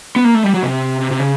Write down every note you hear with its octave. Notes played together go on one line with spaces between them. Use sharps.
B3
A#3
A3
G3
F#3
C3
C3
C3
C#3